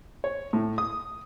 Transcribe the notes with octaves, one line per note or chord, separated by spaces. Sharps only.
C#5
A2
D#6